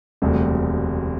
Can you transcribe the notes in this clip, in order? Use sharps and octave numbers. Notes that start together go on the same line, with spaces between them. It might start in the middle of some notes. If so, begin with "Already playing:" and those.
E1 D2 C3 G3